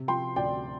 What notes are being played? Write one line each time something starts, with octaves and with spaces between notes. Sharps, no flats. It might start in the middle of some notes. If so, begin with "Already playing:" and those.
Already playing: C3
F3 G5 C6
D2 D5 G5